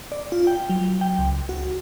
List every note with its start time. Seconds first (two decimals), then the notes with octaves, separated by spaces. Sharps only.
0.12 D5
0.32 F4
0.47 G5
0.70 F#3
1.01 G5
1.19 C#2
1.49 F#4